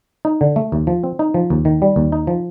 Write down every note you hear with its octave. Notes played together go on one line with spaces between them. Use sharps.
D#4
D3
A3
D#2
F3
C4
D#4
F3
D#2
D#3
G3
D#2
D#4
F3